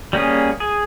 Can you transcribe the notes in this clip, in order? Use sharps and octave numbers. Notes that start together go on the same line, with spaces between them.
G3 A#3 C#4 G#4
G#4